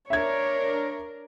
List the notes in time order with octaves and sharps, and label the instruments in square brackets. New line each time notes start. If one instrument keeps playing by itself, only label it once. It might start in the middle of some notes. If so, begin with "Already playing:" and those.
[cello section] D4 A#4 [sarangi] C#5 [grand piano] E5 G#6